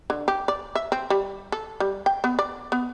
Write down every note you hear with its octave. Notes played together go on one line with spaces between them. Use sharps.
D3
G4
D5
E5
C4
G3
A4
G3
G5
B3
D5
B3